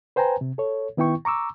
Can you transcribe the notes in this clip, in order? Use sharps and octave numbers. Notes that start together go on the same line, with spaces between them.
B4 C5 G5 G#5 A#5
C3
A4 C#5
D#3 B3 E4 G5 C#6
A#5 C#6 D6 E6